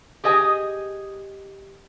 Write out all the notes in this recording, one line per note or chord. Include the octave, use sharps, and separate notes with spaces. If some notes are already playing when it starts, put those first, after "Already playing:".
G4 G#4 D#5 G#5